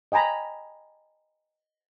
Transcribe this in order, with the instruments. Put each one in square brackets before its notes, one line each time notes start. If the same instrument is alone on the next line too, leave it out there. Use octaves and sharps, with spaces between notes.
[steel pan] D#5 G5 G#5 A#5 B5